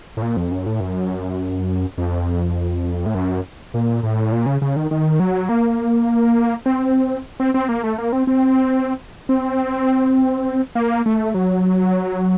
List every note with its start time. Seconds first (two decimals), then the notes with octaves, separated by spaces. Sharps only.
0.17 A2
0.22 A#2
0.37 F2
0.51 F#2
0.66 A2
0.80 F#2
1.98 F2
3.06 A2
3.15 F#2
3.74 A#2
4.03 A2
4.32 A#2
4.46 C#3
4.62 C#3
4.76 D#3
4.91 D#3
5.20 F#3
5.49 A#3
6.66 C4
7.40 C4
7.54 C4
7.69 A#3
7.83 A3
7.98 A#3
8.12 C4
8.27 C4
9.29 C4
10.75 A#3
11.06 A3
11.34 F#3